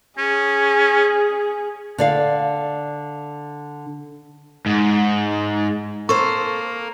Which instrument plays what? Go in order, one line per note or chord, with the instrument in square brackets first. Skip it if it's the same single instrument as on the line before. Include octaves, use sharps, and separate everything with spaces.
[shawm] C#4 [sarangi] G#4
[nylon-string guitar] D3 D5 F5
[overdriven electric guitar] G#2
[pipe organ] A#3 A#4 [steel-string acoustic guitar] A4 C5 [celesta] C#6